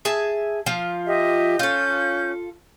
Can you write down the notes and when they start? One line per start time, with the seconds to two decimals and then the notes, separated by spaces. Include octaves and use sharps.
0.05 G#4 E5 A5
0.66 F3 F4
1.06 G4 D#5 E5
1.59 C#4 F4 A4 G6